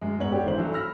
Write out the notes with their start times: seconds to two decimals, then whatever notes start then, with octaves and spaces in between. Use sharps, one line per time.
0.01 F#2 G#3
0.19 G#2 B3 C#5 F#7
0.32 G4 A4 D5 F#5
0.44 G#1 E3 D4 C5 F#7
0.58 E3 F#3 A4
0.72 B5 E6 F6 A#6